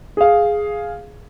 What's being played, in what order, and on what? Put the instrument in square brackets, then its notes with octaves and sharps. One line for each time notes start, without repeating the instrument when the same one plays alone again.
[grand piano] G#4 F5